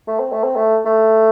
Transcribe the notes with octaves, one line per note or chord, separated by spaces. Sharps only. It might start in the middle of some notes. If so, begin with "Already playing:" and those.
A3
C4
A3
C4
A3
A3